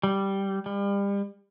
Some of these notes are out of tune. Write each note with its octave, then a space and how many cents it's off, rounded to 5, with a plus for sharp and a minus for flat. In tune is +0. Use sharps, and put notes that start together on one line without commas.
G3 -5
G3 +35